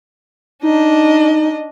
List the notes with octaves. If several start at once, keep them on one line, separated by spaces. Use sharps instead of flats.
D4 D#4 D#5